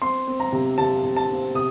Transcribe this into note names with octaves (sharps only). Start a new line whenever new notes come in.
C4 C6
C4
A#5
C3
C3 A5
C3
A5
C4
C3 D#6